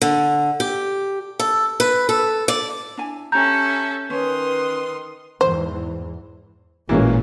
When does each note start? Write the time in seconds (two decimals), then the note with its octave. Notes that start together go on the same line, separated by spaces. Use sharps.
0.02 D3
0.60 G4
1.39 A4
1.80 B4
2.09 A4
2.48 D5
2.97 D4 E4 G#5
3.32 C#4 G4 A4 E5 A#5 G6
4.10 D#3 C#4 B4 C#5 C6 D#6
5.41 E2 G#2 E3 C5
6.89 A1 A#2 E3 G#3 A#3 C#4